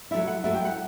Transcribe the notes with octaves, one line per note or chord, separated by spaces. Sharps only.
F#3 A3 E4 E5
F#5
F#3 A3 E4 E5
G5
F#5